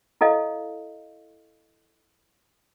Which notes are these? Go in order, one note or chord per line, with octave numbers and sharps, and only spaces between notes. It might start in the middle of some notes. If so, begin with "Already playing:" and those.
E4 A4 D#5 F5